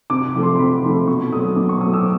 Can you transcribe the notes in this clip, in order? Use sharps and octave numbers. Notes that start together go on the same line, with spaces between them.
C3 D6
D6
F3 A3
C6
C6
C3 B5
F3 A3 C6
B2 C#6
F#3 A3 D#6
B2 D6
C#6
F#3 A3 D#6
E6
D6